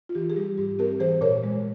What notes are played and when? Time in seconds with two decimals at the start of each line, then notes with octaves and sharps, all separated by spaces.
0.09 F4
0.15 E3 G4
0.30 G#4
0.36 G3 G4
0.58 G#2 G4
0.79 C4 G4 A#4
1.00 E3 G#4 C5
1.21 A#2 A#4 C#5
1.43 G#3